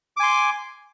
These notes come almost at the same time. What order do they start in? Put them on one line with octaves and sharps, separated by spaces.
D6 G#5 C6